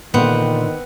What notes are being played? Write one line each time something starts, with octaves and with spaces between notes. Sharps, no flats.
A#2 D3 D#3 B3 C4